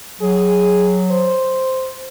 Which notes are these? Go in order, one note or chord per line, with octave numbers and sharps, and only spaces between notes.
F#3 G#4
C5